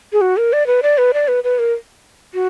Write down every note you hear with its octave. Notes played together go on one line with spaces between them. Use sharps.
G#4
F#4
A#4
D5
B4
D5
B4
D5
B4
B4
A#4
F#4